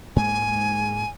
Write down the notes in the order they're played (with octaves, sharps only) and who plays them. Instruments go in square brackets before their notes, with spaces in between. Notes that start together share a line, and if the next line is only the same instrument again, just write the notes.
[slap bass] G#2 G#3 A#3 [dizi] G#5